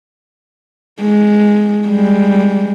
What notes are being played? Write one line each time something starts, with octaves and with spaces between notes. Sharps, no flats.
G#3
G3 G#3